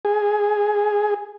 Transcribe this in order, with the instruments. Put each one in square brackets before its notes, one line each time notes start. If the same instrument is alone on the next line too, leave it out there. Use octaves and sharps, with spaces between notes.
[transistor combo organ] G#4